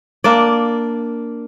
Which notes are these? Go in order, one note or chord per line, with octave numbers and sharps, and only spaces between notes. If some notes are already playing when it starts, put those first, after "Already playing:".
A#3 D4 D5